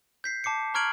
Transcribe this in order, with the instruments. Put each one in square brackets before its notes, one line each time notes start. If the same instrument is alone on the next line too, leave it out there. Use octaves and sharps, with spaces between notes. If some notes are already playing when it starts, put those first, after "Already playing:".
[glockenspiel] G6 B6 C7
A5 D6 C7 C#7
A#5 C#6 F6 G#6 D7 F#7